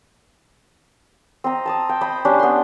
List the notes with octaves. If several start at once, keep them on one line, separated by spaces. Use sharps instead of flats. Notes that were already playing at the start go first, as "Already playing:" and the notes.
C4 D#5 A#5
A5 A#5 D#6
G5
C5 D#5 G5 B5
C#4 D4 G4
B3 C6